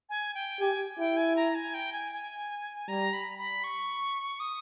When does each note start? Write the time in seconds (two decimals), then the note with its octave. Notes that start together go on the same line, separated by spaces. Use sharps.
0.09 G#5
0.35 G5
0.60 G4 G#5
0.98 E4 G5
1.17 G#5
1.36 A#5
1.55 G#5
1.74 G5
1.93 G#5
2.13 G#5
2.88 G3 A#5
3.13 B5
3.38 B5
3.64 C#6
4.40 D#6